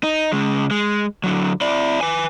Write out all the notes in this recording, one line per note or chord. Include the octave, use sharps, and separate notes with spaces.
D#4
C#3 G#3
G#3
D3 F#3
E4 D5
B4 G#5